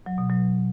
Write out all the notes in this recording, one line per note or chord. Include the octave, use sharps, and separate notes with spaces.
F#3
B2
F#3